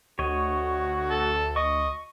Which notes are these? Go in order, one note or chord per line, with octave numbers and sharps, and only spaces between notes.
D2 F#4 C#5 D#5
A4
D#5 C#6